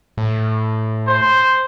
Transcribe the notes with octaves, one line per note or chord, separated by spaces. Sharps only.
A2
C5